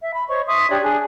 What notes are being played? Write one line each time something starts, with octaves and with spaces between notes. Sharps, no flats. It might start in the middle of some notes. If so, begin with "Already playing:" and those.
E5
B5
C5 C#5 D#5 C#6
E5 C6 C#6 D#6
D4 G4 C#5 D5
D4 G#4